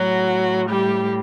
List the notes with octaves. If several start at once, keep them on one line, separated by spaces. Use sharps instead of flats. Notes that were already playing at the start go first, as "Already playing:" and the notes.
Already playing: A2 F#3 F#4
G3 G4